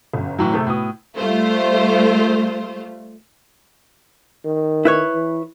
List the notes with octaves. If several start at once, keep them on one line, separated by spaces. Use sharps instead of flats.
G1 F#2
A2 E3 F#3
C3 A3 E4 G#4 A4
A2 B3 F#4 D#6
G3 A3 F4 C5
D#3
E4 B4 C#5
E3